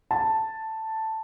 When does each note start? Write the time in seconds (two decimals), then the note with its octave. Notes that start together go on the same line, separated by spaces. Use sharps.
0.11 A5